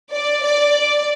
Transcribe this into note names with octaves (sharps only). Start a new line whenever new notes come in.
D5
D5